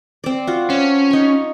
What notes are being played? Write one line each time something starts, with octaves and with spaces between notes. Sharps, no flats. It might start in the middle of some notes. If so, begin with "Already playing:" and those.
C4 D5
F4 F#4
C#4 A5
D#4 C#6